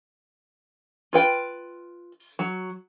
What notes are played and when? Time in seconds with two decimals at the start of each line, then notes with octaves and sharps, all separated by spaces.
1.13 F4 B4 G5
2.39 F#3